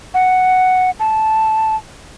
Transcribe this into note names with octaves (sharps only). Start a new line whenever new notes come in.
F#5
A5